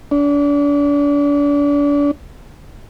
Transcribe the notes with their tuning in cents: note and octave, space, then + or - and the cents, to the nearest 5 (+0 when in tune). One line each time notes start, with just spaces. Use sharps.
D4 -35